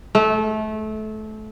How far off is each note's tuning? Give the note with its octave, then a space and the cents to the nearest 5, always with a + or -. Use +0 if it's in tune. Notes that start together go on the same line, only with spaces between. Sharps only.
A3 -25